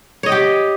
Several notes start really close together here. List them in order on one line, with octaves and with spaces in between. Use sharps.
C#5 D#5 G5 G4